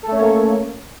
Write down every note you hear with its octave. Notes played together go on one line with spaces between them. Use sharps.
A3 A#3 C#4 A4 C#5